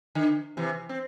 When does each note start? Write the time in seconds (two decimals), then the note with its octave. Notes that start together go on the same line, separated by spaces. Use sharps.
0.15 D3
0.57 C3 E3
0.89 C4